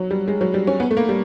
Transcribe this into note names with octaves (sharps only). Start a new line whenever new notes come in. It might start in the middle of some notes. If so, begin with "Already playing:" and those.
Already playing: F#3
G3
G#3
F#3
G3
C#4
B3
A3
A#3
G3